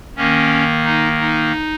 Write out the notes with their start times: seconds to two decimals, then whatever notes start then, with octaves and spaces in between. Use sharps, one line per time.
0.17 D#3 A#3 C#4
0.85 D#4
1.19 D#4